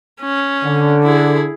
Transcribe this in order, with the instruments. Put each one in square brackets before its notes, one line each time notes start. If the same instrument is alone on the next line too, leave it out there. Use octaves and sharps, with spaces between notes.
[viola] C#4
[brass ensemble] D3
[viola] E4 G#4